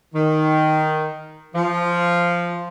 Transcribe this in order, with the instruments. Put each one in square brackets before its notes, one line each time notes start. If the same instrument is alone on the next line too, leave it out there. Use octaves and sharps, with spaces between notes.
[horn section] D#3
F3